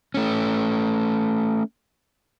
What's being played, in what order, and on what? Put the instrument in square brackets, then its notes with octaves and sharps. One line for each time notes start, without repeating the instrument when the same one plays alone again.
[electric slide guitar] A3 C#4